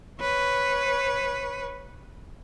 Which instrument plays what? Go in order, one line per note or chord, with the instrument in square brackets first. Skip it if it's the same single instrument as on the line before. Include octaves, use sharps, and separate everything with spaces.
[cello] B4 C#5